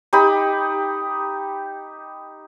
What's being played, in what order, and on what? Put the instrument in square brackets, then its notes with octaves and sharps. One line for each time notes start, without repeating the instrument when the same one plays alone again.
[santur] D#4 G4 D#5 B5